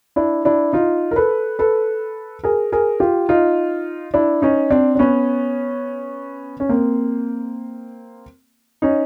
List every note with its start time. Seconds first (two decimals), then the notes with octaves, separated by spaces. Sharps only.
0.16 D4 E4
0.45 D4 E4
0.73 D#4 F4
1.11 A#4
1.16 A4 B4
1.59 A4 B4
2.44 G#4 A#4
2.72 G#4 A#4
3.00 F4 G4
3.29 D#4 F4
4.14 D4 E4
4.42 C#4 D#4
4.70 C4 D4
4.95 D4
4.99 B3 C#4
6.60 C#4
6.69 A#3 C4
8.82 C#4 D#4